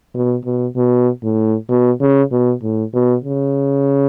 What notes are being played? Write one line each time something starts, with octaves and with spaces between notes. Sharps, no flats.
B2
B2
B2
A2
B2
C#3
B2
A2
B2
C#3